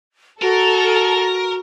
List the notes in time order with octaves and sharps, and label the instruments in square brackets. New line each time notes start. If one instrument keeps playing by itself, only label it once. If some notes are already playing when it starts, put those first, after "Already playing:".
[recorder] F#4 [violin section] A4 [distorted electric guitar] A#4